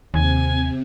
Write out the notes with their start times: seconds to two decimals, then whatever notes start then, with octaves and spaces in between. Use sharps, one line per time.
0.14 D#2 C3 G#5